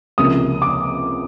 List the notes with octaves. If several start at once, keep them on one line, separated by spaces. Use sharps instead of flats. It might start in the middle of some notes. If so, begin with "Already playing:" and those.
C#2 C3 F3 A#3 D#6
D6